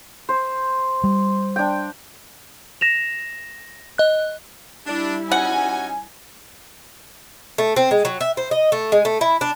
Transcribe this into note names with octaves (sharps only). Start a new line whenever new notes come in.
C5
G3
D4 G5
A#6 E7 F7
D#5 F#6
G3 D4 E4
C#4 D#4 F#4 F#5 G#5
A3
C4
G#3
F#3
E5
C5
D#5
A3
G#3
A3
E4
D4